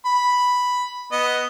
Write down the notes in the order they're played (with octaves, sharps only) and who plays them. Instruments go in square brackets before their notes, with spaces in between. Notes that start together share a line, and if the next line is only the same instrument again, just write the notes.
[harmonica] B5
B3 D#5